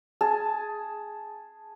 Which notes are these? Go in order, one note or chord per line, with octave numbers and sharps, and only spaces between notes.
G#4 A5